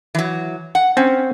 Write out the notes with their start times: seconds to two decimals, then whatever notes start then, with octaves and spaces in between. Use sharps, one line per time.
0.15 E3 F#3
0.75 F#5
0.97 C4 C#4